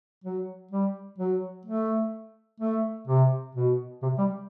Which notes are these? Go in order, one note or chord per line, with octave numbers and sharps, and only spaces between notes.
F#3
G3
F#3
A3
A3
C3
B2
C3
G3